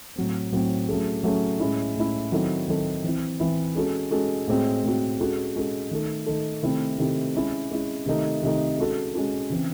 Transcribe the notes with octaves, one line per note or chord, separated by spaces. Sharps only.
A2 F#3 C4
A2 F#3 C4
F#3 A3 C#4 G#4
F#3 A3 C#4 G#4
A2 G#3 C#4 E4
A2 G#3 C#4 E4
D#3 F#3 C4 E4 A4
D#3 F#3 C4 E4 A4
E3 C4 E4
E3 C4 E4
G#3 C#4 F#4 A4
G#3 C#4 F#4 A4
A2 G#3 C4 F#4
A2 G#3 C4 F#4
G#3 C#4 F#4 A4
G#3 C#4 F#4 A4
D#3 A3 D#4 A4
D#3 A3 D#4 A4
C3 D#3 A3 C4 E4
C3 D#3 A3 C4 E4
G#3 C#4 E4
G#3 C#4 E4
C3 D#3 A3 D#4 A4
C3 D#3 A3 D#4 A4
G#3 C#4 F#4 A4
G#3 C#4 F#4 A4
C#3 E3 C4